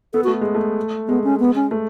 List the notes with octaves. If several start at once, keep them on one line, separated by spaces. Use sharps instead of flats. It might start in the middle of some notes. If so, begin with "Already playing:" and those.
B3 A4
F#4
A3
G#3
A3
G#3 B3
C#4
B3
C#4
A3